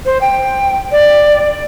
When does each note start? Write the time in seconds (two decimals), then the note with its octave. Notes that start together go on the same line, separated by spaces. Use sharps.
0.06 C5
0.21 G5
0.92 D5